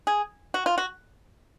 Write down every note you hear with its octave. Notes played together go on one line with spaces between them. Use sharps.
G#4
F#4
F4
F#4